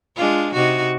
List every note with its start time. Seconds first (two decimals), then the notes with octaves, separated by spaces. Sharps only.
0.16 G#3 D4 F4
0.53 C3 D#4 F#4